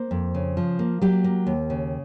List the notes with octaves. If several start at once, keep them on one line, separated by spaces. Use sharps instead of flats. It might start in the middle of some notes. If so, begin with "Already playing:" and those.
Already playing: A#3 C5
F2
C#3
F3
A#3
F#3 G4
A#3
D#2
C#3